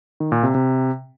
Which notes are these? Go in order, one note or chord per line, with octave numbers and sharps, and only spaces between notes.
D#3
A#2
C3
C3